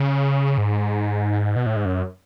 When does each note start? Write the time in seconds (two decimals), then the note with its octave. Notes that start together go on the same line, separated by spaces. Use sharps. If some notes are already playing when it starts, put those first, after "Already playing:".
Already playing: C#3
0.58 G#2
1.56 B2
1.66 A2
1.76 G#2
1.85 F#2